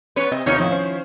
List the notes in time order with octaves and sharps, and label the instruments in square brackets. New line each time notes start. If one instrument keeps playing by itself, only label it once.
[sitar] B3 B4 [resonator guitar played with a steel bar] C#4 C#5
[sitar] C3 [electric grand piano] C4 [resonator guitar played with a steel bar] D#5
[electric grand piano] D#2 C3 [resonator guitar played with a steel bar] B3 F4 [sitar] D#4 C#5
[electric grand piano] A2 C4 D#4 [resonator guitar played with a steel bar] D#3 [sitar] F3 E4
[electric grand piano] C#4 C5